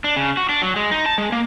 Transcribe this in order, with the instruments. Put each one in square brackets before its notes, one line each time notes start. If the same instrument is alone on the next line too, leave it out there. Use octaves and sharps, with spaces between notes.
[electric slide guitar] D4
C#3
F#4
D4
F#3
G#3
D#4
A5
G#3
A#3